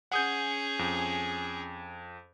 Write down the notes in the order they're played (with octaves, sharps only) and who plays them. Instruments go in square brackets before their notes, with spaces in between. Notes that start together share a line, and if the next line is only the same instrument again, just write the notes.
[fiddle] C#4 G#4 [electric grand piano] F#5 D#6 G6
[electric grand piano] F2